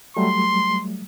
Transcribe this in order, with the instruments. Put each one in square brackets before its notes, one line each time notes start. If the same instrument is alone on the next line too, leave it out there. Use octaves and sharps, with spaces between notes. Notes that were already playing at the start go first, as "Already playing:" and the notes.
[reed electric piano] F#3 G3 A3 [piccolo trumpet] C6